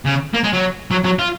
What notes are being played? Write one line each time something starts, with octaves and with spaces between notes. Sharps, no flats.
C#3
A#3
G#3
F#3
F#3
F#3
F4